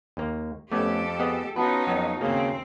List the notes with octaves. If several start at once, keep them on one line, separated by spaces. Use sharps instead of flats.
D#2 A#3
F2 A3 B3 C#4 G4 A4 D6
B3 G#4 D#5
B3 C#4 D#4 F4 F#4 B4 A5
F2 F#3 B3
D#2 C#3 A#3 C4